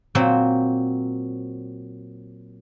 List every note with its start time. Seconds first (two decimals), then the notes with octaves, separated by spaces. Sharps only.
0.15 A#2 F#3 C4